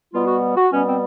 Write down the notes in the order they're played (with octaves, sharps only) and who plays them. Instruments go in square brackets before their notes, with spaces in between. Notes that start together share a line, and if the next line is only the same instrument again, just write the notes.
[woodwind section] B2 G3 B3 F4
F#4
F#4
B2 G3 B3 C#4
C4